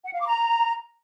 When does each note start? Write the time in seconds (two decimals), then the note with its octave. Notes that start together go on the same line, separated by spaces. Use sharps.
0.05 F#5
0.12 F5
0.20 D6
0.27 A#5